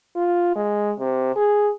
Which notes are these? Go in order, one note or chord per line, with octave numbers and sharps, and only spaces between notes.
F4
G#3
C3
G#4